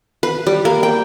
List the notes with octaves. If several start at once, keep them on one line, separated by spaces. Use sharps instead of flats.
B4
G3
A#3
G5